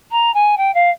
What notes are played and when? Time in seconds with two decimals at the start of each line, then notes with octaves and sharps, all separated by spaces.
0.11 A#5
0.34 G#5
0.57 G5
0.74 F5